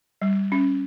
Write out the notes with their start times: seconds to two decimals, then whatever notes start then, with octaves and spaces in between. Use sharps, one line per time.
0.22 G3
0.52 C#4